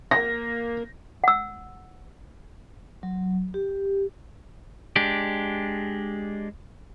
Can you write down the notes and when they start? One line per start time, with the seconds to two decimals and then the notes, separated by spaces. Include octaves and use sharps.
0.11 A#3 A#6
1.24 F#5 E6
3.03 F#3
3.54 G4
4.96 G#3 D4 G4